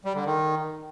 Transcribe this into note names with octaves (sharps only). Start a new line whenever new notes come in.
G3
D3
D#3